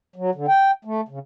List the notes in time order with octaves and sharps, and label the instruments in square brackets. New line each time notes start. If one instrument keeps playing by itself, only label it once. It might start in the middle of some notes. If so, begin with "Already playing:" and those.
[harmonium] F#3
D3
G5
A3
C#3